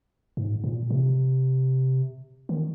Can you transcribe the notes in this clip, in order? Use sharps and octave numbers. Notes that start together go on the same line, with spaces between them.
G#2
A#2
C3
D#3